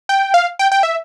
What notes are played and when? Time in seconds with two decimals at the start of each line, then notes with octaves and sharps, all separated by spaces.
0.09 G5
0.34 F5
0.59 G5
0.72 G5
0.83 E5